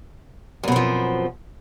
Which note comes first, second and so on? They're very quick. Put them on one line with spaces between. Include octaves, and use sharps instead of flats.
F#2 B2 C4 F3